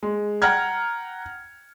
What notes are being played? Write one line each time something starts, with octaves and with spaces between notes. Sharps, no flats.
G#3
F#5 G5 A#5 F6 G#6